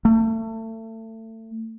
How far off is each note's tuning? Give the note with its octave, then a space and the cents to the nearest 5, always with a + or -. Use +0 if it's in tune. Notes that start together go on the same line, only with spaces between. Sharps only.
A3 +30